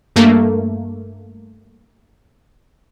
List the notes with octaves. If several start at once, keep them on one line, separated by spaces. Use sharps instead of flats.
G2 A3 A#3